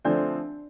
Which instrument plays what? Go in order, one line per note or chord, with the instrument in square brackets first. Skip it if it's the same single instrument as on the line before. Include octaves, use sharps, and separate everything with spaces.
[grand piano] D3 F3 A3 C4 [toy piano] D4 D5